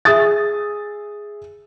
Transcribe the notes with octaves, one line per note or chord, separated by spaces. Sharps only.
G#4 E5 D#6 A6